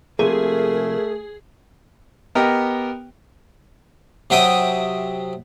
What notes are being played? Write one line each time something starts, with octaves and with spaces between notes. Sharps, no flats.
C3 F3 A3 A#3 G#4 A#4
B3 G4 A#4 D#5 G5
C3 F#3 E5 G5 D#6